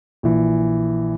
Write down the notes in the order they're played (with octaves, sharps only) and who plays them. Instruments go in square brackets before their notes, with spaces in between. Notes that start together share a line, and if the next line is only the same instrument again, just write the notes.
[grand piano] A#1 E3